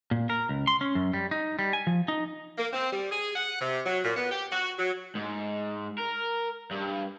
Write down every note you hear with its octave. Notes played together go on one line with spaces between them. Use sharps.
A#2
A#4
C#2
C6
C#4
F#2
G3
D#4
G3
G#5
F3
D#4
A#3
C4
G3
G#4
F#5
C3
F#3
A#2
B3
G4
F#4
F#3
G#2
A#4
G2